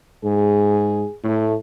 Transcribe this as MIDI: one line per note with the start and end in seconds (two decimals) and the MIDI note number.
0.24 1.05 44
0.24 1.16 68
1.24 1.56 45
1.24 1.56 57